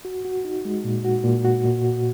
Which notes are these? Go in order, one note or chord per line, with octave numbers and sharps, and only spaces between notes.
F#4
F#4
D#4
G#3
A#2
F#4
A#2
F#4
A#2
F#4